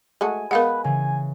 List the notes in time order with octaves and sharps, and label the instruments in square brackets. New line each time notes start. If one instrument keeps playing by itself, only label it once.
[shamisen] G#3 A3 F#4 [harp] G#5
[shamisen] G#3 B3 [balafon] A#4 F5 F#5 [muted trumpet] B4
[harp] C#3 E3 [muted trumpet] G#5